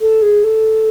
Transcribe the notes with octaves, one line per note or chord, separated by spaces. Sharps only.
A4
G#4
A4